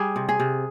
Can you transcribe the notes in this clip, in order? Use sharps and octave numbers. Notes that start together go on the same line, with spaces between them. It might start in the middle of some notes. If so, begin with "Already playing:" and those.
Already playing: G3 G#4
C3
G#4
C3